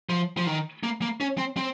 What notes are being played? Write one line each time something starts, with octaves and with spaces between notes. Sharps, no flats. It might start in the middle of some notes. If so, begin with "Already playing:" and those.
F3
F3
D#3
A#3
A#3
C#4
C4
C4